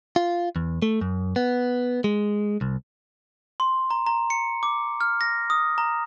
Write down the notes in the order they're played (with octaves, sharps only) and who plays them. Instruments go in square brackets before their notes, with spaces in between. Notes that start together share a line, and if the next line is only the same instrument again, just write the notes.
[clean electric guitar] F4
E2
A3
F#2
B3
G#3
C2
[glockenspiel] C6
A#5
A#5
C#7
D6
F6
A#6
D#6
A#5